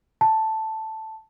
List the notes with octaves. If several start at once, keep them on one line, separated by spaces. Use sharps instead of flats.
A5